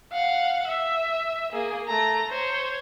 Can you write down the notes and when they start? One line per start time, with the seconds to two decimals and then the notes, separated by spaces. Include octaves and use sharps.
0.13 F5 F#5
0.68 E5
1.52 A#3 G#4
1.88 A3 A#5
2.28 C5 C#5